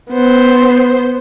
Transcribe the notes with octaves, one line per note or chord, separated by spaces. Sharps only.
B3 C5